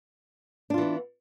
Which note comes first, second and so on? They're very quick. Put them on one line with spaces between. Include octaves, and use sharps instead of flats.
D4 F4 E3 B3